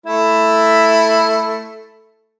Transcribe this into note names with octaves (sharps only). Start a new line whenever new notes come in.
A3 E4